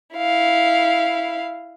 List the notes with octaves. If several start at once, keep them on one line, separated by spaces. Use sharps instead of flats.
E4 F5